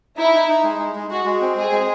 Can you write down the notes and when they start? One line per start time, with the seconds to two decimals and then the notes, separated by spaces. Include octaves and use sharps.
0.17 D#4 E4
0.34 D#4
0.49 D#4
0.64 G#3
0.79 G#3
0.95 G#3
1.11 G#3 F#4
1.25 G#3
1.41 C4
1.57 G#3 G#4
1.72 G#3